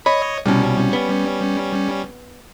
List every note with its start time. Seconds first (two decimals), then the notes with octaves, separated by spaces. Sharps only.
0.06 C#5 D#5 B5
0.46 C2 B2 G3 C#4
0.93 B3